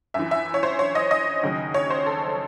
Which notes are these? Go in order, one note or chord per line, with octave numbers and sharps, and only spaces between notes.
F#2 E3 E5
E5
C#5
C5
C#5
D#5
D#5
D#2 C#3 F#3
C#5
C5
A4